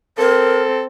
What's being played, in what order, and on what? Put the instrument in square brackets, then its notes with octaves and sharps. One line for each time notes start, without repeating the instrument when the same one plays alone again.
[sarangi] C4 [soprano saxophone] A4 [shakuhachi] A#4